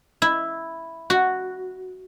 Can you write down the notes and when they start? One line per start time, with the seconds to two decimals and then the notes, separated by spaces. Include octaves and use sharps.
0.22 E4
1.10 F#4